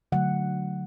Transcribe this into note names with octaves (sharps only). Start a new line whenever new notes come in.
D3 F#3 A3 F#5